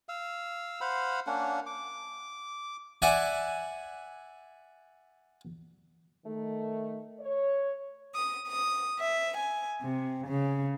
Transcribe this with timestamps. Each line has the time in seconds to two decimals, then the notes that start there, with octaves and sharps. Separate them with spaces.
0.09 F5 E6
0.81 C5 F5 F#5 B5
1.27 A#3 C#4 D4 F#5
1.66 D6
3.02 D5 E5 F#5 G#5
6.25 D#3 A3
7.20 C#5
8.15 D#6
8.47 D#6
8.99 E5
9.38 G#5
9.82 C3
10.26 C#3